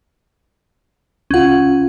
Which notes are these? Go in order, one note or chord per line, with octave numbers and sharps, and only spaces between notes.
C#2 C#4 F4 F#5